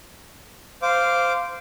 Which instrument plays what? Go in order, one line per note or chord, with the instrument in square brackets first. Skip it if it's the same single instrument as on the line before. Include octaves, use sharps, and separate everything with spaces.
[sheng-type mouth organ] C5 F5 D6